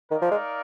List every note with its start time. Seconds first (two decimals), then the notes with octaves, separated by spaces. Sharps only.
0.11 D#3 D#4 A#4 D5 F5
0.22 F3
0.31 G#3